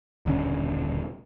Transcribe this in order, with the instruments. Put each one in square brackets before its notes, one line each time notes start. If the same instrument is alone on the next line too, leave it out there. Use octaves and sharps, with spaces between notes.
[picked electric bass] D#1 B1 D3 C#4